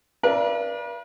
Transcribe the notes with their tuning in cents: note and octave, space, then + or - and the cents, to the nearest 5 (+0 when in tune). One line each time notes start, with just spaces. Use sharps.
B4 -45 D5 +0 F5 -45